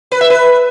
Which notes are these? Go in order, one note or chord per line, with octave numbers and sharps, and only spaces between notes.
B4
E5
B4